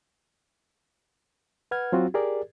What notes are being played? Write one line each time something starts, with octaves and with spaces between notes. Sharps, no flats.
B4 F#5 F6 G#6
F#3 C4 F4 F#4
G4 G#4 A#4 D5